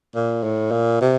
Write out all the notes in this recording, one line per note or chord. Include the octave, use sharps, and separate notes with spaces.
A#2
A2
A#2
C3